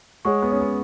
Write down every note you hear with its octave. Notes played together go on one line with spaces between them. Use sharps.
G#3 G#4 C#5 F#5 C#6
B3
C#4
B3